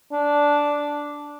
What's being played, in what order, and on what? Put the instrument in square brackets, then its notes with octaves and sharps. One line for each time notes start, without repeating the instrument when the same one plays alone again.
[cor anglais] D4